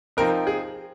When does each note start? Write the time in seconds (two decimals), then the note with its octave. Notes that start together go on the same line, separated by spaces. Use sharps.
0.17 F3 C4 D#4 A#4
0.47 G#4